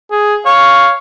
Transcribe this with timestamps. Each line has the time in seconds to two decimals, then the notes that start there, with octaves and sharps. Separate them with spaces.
0.11 G#4
0.46 C#5 F5